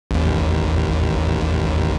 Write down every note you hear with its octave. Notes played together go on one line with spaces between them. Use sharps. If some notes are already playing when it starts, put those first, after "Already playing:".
A1 D#2